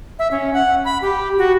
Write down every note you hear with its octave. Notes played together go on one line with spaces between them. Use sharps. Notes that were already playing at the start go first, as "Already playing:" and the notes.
E5
C#4
F#5
B5
G4
F#4